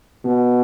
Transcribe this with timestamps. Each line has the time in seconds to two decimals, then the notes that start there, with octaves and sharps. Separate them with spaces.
0.25 B2